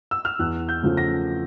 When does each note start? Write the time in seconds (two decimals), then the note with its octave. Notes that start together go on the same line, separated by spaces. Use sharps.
0.11 E6
0.25 F6
0.39 E2 F#6
0.69 G6
0.83 C#3 F3 A3
0.97 A#6